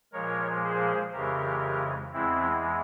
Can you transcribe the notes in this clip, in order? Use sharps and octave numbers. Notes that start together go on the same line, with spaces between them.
A#2 F3 G#3 A#4 C#5
G#4 C5
F2 C#3 E3 G#3 G4 A#4
E2 E3 G#3 C4 E4